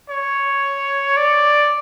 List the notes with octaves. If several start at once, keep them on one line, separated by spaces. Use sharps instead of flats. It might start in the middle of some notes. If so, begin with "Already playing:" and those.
C#5
D5